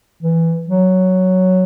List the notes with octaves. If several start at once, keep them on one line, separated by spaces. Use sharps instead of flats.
E3
F#3